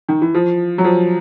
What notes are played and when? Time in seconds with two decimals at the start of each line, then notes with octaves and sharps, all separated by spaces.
0.09 D#3
0.22 E3
0.34 F3
0.78 F#3
0.84 F3